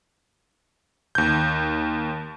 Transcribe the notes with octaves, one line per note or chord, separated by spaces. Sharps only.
D#2 G6